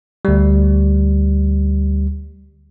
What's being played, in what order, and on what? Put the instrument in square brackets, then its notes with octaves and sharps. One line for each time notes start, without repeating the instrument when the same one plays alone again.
[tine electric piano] D2 G3